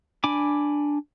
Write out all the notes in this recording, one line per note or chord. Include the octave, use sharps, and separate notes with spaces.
D4 G#5 B5 D6